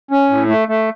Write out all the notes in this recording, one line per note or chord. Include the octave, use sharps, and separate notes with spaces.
C#4
A2
A3
A3